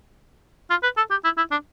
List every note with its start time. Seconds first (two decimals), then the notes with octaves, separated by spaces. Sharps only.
0.70 F4
0.83 B4
0.97 A4
1.11 G4
1.24 E4
1.37 E4
1.51 D4